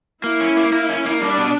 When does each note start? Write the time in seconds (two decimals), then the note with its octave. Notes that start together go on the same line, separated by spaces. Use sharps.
0.24 A#3 E4
0.40 C#4
0.57 A#3
0.72 A#3
0.89 C#4
1.05 A#3
1.21 G3 D4
1.38 B2